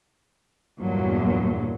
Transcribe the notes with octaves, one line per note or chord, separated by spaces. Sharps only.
E2 G2 A#2 F#3